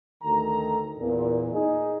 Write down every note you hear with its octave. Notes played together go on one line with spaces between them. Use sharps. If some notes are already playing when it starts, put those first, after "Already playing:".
D2 D#3 A4 A#5
E2 A#2
D#4 G#4 D#5